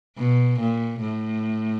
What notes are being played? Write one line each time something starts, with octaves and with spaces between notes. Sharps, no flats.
B2
A#2
A2